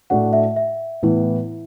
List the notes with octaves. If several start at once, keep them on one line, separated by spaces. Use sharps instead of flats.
A2 A3 D4 F#4 F#5
E5
E5
A2 E3 B3 E4